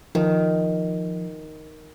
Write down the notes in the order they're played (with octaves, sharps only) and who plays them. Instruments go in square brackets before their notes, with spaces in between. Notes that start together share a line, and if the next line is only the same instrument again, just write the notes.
[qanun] D#3 [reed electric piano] F3